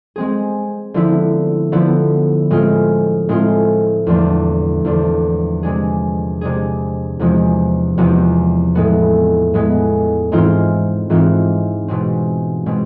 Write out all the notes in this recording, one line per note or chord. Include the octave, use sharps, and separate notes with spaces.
G#3 C4 G#4
D3 F3 B3 E4
D3 F3 B3 E4
A2 G#3 C4 F4
A2 G#3 C4 F4
E2 D3 F3 A3 D4
E2 D3 F3 A3 D4
C3 G#3 D4 G#4
C3 G#3 D4 G#4
E2 C3 F3 G#3 B3
E2 C3 F3 G#3 B3
A2 G#3 B3
A2 G#3 B3
G#2 E3 G#3 C4 F4
G#2 E3 G#3 C4 F4
B2 G#3 C4
B2 G#3 C4